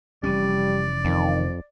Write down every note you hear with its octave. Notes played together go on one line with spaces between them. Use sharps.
F1 E3 G3 C#4 D5
F2 D#3